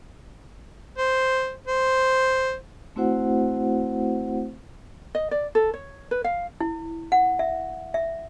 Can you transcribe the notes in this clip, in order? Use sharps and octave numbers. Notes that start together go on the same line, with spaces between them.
C5
C5
A3 C4 E4 F#4 C5 F#5
D#5
D5
A4
C#5
B4
F5
E4
F#5
E5
E5